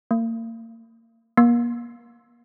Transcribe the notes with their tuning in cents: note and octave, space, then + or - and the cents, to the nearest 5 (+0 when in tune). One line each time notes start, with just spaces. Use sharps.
A#3 -40
A#3 +35